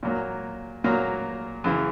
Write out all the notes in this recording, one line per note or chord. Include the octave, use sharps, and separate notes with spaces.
A#2 F#3 A#3
A#2 F#3 A#3
F#2 C#3 E3